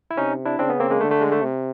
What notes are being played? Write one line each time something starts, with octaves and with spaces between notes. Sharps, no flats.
E4
C3 C#4 D#4
D4 E4
C#3 C4 D4
B3 C#4
A#3 C4
G#3 A#3
D3 A3
A3
G#3
A3
C3